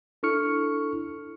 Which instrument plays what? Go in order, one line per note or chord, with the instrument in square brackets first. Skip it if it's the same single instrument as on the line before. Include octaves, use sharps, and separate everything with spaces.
[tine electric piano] D4 E4 A4 C#6 F6 C#7